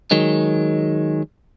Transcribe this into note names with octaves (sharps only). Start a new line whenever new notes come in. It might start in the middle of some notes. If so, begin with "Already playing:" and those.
D#3 F#3 G#3